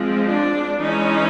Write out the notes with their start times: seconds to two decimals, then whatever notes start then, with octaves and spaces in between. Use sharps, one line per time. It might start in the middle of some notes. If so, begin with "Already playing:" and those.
Already playing: F3 G#3 C4
0.27 D4
0.80 E3 G#3 C#4 D#4